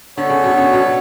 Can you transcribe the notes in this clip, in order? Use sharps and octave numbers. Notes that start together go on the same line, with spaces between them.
D3 B3 D4 A4 C#5
C#3
B2
C#3
B2